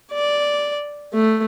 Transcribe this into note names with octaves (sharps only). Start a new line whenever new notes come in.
D5
A3